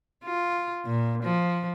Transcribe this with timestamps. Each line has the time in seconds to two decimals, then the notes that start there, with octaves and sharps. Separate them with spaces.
0.24 F4
0.85 A#2
1.23 F3